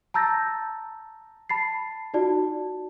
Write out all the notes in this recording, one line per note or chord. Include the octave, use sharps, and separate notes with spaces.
A5 A#5 E6 G6 A6 A#6
A5 B5 A6 C7
D#4 F4 F#4 D5 A5